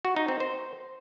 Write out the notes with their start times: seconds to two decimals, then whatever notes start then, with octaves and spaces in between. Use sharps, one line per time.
0.05 F#4
0.16 D#4
0.28 C4
0.40 C5